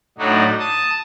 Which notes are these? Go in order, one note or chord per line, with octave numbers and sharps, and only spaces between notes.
A2 F#3 A3 D4 D#4 F#4
A5 D#6